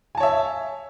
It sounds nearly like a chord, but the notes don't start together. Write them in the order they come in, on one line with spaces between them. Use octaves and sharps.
G#5 A5 C#5 E5